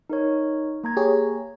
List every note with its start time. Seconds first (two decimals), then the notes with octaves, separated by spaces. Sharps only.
0.10 D#4 A#4 C#5
0.84 A#3 A#5 G#6
0.97 G4 G#4 C#5